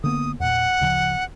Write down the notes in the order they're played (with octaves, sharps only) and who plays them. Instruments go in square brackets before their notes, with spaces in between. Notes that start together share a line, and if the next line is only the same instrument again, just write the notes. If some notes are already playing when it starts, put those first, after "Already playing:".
[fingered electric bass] D3 A#3 B3 [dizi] D#6
[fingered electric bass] E2 A#2 [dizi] F#5
[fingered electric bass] D2 C#3 F3